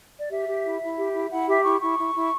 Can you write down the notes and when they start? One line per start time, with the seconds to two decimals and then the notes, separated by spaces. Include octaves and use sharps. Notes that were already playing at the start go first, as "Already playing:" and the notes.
0.20 D5
0.30 G4 E5
0.48 G4
0.64 E4
0.81 E4
0.98 G4
1.15 E4
1.31 E4 F#5
1.48 G4 E5
1.65 E4 C#6
1.81 E4 C#6
1.98 E4
2.15 E4